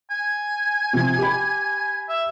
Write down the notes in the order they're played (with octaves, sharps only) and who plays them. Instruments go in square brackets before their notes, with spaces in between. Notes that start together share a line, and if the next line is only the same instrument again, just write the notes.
[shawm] G#5
[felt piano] C3 F3
G4 B5
[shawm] E5